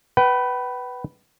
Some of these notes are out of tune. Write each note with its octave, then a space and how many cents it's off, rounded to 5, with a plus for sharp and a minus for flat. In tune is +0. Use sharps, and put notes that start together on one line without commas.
B4 +0 G5 -45